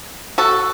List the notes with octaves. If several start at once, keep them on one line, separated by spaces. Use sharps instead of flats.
F#4 A4